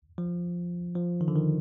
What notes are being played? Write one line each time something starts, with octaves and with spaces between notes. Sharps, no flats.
F3
F3
D#3
D3
D#3